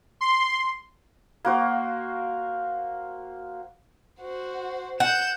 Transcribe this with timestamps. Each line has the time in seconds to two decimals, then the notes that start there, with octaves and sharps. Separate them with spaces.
0.21 C6
1.45 A#3 F#4 C5
4.21 F#4 C5
5.00 F#5 G6 E7